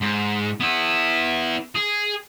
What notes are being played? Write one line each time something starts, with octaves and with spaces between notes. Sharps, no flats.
G#2
B3 E4
G#4